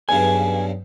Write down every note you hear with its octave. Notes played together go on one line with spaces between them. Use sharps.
B1 G2 C#3 G#5